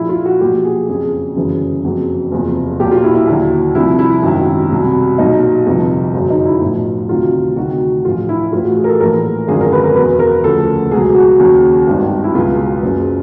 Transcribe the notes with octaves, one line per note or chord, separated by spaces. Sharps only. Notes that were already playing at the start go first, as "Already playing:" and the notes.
Already playing: A#1 A#2 F3 E4
F4
F#4
B1 A#2 F3 G4
G#4
F#1 F2 C#3 F3 G#4
G1 F#2 C#3 E3
F#1 F2 C#3 F#3
F#1 E2 C3 F3
B1 A#2 F#3 G4
F4
E4
E4
D#2 D3 F#3
C2 C3 F3 E4
E4
G#1 F#2 D#3 F#3
C2 B2 F#3
B1 A#2 F#3 D#4
G1 F2 C3 F3
G1 F#2 C#3 F#3
D#4
E4
B1 A2 F3
D2 C3 D#3 F#3 F4
D2 C3 D#3 F#3 F#4
A1 A2 F3 F4
E4
A1 A2 E3 F4
F#4
G#4
A#4
A4
A#1 A2 E3 A#4
G#1 F#2 D3 F3 G#4
A#4
B4
A#4
E2 B2 F#3 B4
A#4
D2 C#3 F3 A4
C#2 B2 F#3 G#4
F#4
D#2 C#3 F#3
G#1 G2 D#3
E4
C#2 B2 F#3 F4
F#1 F#2 C#3